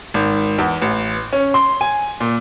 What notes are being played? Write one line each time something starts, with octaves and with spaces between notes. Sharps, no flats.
G#1
E2
A1
C#4
C6
G#5
A#2